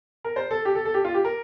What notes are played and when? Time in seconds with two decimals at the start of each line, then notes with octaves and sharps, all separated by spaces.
0.24 A#4
0.36 C5
0.51 A4
0.65 G4
0.75 A4
0.85 A4
0.94 G4
1.05 F4
1.14 G4
1.25 A#4